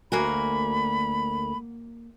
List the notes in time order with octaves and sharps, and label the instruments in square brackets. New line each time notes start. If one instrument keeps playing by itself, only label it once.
[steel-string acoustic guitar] D2 A#4 G#5 [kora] A#3 F#4 [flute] B5